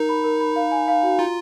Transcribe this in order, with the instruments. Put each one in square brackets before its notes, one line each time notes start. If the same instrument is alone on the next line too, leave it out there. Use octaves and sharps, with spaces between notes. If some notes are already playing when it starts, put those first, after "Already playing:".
Already playing: [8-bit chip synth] D#4 [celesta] A#4
[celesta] B5
A#4
B5
F5
G#5
F5
F#4
[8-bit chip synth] F4 [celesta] A#5